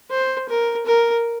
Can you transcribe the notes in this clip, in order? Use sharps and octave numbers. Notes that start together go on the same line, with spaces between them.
C5
A#4
A#4